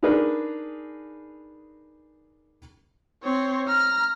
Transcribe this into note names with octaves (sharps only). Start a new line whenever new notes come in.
D4 D#4 G#4 A#4 B4
C4 C#5
A#5 F6